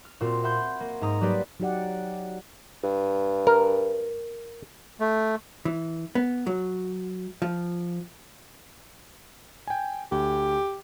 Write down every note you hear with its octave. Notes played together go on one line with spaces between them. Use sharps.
F6
A#2 C4 F4 F#4
E5 F#5 B5 C6 G6 G#6
A#3
G#2 G#3 A#5 D#6
F#3 G3 A#3 G4 B4 D5
F#3 D#4 G4 D5 F#5
G2
A#4
A3
E3
B3
F#3
F3
G5 G#5
D2 G4